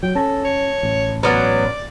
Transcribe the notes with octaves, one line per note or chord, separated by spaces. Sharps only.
F#3 G5
C#4 A4 A5 A#6
C#5
A1
F#3 B3 D5 C6 F6 A6